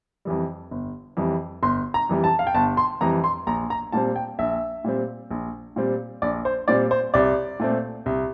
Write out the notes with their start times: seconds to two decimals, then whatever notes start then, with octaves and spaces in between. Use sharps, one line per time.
0.25 F2 E3 G3
0.71 G1
1.17 F2 E3 G3
1.63 G1 C6
1.94 A#5
2.09 F2 E3 G3
2.24 A5
2.39 F5
2.47 G5
2.55 G1 A5
2.77 C6
3.01 F2 E3 G3 A#5
3.24 C6
3.47 A#1 A#5
3.70 A#5
3.92 A#2 G3 C4 A5
4.16 G5
4.39 A#1 E5
4.84 A#2 G3 C4
5.31 A#1
5.76 A#2 G3 C4
6.22 A#1 D5
6.45 C5
6.68 A#2 G3 C4 D5
6.91 C5
7.14 C2 D5
7.60 A#2 A3 C4
8.06 C2